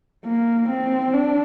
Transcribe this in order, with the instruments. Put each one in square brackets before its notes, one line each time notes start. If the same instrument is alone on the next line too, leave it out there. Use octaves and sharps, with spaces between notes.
[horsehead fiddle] A#3
C4
D4